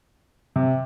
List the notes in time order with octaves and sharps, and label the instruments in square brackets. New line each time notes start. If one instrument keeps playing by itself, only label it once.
[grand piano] C3